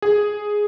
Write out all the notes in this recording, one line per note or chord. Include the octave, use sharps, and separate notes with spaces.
G#4